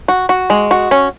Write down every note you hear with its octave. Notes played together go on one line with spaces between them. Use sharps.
F#4
F#4
G#3
F#4
C#4